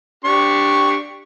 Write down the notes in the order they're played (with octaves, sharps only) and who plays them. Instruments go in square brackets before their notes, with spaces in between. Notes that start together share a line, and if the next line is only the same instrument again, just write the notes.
[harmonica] D4 G4 C#6